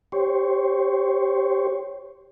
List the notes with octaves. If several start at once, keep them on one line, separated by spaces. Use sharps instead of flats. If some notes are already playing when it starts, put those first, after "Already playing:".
G4 C5 C#5